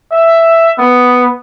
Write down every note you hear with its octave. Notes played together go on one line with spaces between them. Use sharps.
E5
B3